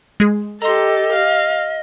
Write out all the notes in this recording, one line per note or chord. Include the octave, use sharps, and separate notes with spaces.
G#3 G#4
G4 A4 D#5 A#5 C6
F5